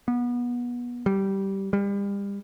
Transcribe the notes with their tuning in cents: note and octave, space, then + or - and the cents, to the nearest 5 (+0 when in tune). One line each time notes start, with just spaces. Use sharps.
B3 -25
G3 -10
G3 +35